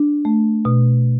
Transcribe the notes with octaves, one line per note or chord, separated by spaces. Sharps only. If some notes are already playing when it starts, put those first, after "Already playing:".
Already playing: D4
A3
B2